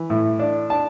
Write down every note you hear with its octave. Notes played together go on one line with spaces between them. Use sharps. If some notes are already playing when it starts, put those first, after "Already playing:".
Already playing: E3
A2
D4
D4 A5